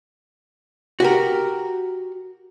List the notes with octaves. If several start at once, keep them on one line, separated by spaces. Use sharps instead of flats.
F#4 G4 A#4